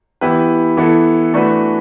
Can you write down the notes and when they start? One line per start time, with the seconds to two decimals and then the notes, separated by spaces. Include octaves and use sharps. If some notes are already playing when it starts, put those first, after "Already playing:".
0.21 E3 B3 E4 G4 B4
0.77 E3 B3 E4 A4
1.33 E3 A3 D4 F#4 B4